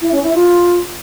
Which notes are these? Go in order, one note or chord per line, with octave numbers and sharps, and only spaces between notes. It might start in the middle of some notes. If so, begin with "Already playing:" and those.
E4
C#4
E4
F4